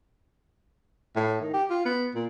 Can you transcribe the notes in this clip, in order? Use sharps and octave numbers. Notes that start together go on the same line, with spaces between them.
A2
D#3
G4
F4
B3
A#2